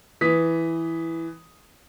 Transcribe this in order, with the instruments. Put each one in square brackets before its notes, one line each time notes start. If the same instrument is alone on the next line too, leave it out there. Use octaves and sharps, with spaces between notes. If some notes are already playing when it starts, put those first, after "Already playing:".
[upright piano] E3 D#6 B6